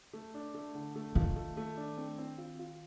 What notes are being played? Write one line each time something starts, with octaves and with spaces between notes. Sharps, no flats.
A3
D4
A3
D3
A3
D#3 F4
A3
A3
D4
C4
C4
F4
F4